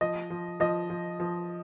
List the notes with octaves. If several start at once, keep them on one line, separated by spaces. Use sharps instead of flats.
F3 D#5
F3
F3 D#5
F3
F3